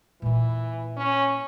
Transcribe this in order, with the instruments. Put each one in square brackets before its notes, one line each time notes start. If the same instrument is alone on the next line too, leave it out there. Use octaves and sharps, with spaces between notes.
[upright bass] A#2 A#3 [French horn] E3
[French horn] C#4